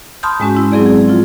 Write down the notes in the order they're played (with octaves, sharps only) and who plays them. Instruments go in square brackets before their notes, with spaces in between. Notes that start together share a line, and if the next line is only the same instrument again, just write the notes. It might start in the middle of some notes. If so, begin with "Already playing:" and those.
[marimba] A5 B5 C6 D#6 F6 G6
G#2 G#3 C#4 F#4
E4
F#3 C4 G#4 D5
G#4
F3 F4